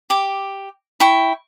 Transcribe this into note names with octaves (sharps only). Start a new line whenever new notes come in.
G4 D6
E4 G5 C#6